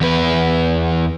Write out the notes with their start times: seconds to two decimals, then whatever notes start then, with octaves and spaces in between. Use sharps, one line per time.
0.01 E2 B4